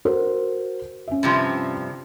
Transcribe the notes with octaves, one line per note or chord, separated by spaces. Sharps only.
F#4 A#4 C5
C#4 E5
G2 C3 F3